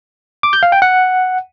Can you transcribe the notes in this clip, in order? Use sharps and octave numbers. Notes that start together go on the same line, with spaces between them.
D6
G6
F5
G5
F#5